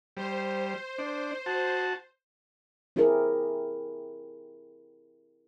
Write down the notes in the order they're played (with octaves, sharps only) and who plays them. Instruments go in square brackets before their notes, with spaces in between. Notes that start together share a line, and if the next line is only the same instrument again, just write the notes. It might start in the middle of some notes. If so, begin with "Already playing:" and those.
[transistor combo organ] G3 [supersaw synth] C5
[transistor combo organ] D4
F#4 A5
[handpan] C4 E4 G4 G#4 A#4